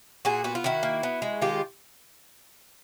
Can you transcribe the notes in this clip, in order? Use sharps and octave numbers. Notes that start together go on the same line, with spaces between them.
A#2 F#4 G#4
B3 F#4
F4
D#3 E4 F#4
A#3
B3
G#3
D#3 F4 G4